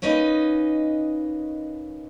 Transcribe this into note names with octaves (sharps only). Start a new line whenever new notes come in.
A#3 C#4 D#4 B4 D#5